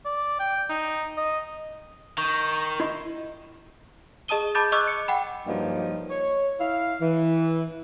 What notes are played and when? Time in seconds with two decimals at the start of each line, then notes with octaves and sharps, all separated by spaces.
0.05 D5
0.40 G5
0.69 D#4
1.17 D#5
2.18 D#3 C#6 G6
2.80 E4 D#5 C6
4.28 G#4 D#5 A5 D#6 D#7 G7
4.55 A5 B5 D6 G6 A6
4.72 D#5 C#6 D6 E6 F#6
4.87 C#7
5.08 F#5 G5 B5
5.47 G2 F3 F#3 A#3 D#4
6.10 C#5
6.60 E4 F5
7.01 E3